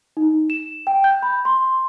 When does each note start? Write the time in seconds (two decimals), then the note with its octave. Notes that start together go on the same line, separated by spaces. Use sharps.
0.17 D#4
0.50 E7
0.87 G5
1.04 G6
1.23 B5
1.45 C6